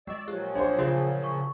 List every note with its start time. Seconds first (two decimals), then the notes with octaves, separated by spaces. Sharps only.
0.07 G#3 D5 D#5 E6
0.28 A#2 F3 F#3 G4
0.55 D4 G#4 C5 C#5
0.79 C#3 F4 C5
1.24 C#6